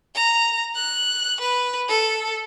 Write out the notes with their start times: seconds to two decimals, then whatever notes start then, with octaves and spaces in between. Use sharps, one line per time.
0.15 A#5
0.75 F#6
1.41 B4
1.88 A4